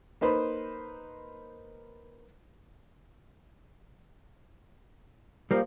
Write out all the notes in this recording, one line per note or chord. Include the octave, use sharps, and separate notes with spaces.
A#3 D#4 B4 C5
F3 G3 A#3